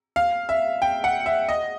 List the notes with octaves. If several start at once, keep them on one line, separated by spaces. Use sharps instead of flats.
F5
E5
G5
F#5
E5
D#5